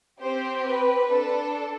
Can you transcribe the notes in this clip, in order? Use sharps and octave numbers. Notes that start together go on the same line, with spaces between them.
C4 G4 C5
B4
D4 A4